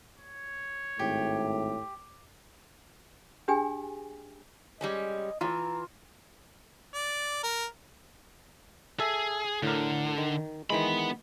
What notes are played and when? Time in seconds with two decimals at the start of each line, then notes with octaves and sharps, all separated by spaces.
0.18 C#5
0.99 G#1 A2 G4
3.48 D4 G4 G#4 G5 G#5
4.81 G3 G#3 C#4 D#5
5.41 E3 F4 A#5 E6
6.94 D5
7.43 A#4
9.00 G#4 A4 E5
9.63 A2 D3 A#4
10.18 D#3
10.70 D#3 E3 G#3 B3 B5